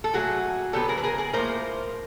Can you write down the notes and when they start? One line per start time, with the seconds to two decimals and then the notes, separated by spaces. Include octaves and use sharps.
0.04 A4
0.13 A#2 F#3 A3 F#4 G#4
0.73 D3 F#3 B3 G4 A4
0.88 G#4 A#4
0.97 B4
1.04 G#4 A#4
1.18 G#4 A#4
1.33 A2 F3 A#3 A#4 C5